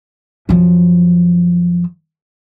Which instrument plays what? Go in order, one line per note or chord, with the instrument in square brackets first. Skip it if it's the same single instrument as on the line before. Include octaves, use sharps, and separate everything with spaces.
[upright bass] F#2 F3